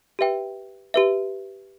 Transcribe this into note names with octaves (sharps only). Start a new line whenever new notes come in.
G4 B4 E5 G5
G4 B4 E5